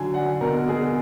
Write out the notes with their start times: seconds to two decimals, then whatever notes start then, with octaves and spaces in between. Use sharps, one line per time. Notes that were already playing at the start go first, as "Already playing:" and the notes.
Already playing: D3 F#3 G#5
0.14 D4 F#5
0.41 B2 A#4
0.68 B2 G#4